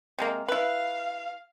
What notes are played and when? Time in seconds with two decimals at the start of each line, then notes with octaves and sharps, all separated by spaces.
0.18 C3 G#3 A#3
0.48 E4 B4 F5